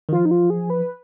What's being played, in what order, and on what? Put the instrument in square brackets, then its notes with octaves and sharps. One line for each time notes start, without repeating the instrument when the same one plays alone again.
[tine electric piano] D#3
[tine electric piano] F3 [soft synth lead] F4
[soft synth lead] D#4
F4
G#4
B4